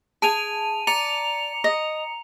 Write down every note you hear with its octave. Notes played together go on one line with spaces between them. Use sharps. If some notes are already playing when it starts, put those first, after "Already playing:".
G#4 G#5 A5 D#7 F7
D5 A#5 C#7 F7
D#5